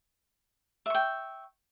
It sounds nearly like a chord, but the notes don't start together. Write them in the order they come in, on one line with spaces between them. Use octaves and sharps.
E5 C#6 G5